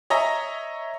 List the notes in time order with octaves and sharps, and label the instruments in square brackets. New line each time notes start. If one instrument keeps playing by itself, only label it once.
[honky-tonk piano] C#5 D#5 E5 A#5